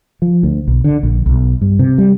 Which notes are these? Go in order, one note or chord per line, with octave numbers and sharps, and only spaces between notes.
F3
D2
B1
D3
A#1
B1
G2
C3
G3